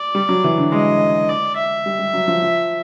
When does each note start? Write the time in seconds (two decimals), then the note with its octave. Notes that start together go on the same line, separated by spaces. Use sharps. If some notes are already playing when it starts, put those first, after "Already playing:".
Already playing: D5
0.15 G3
0.29 F#3
0.44 E3
0.58 D3
0.72 G#3 D#5
1.29 D5
1.57 E5
1.86 G3
1.99 G3
2.14 F#3
2.28 F3
2.42 F3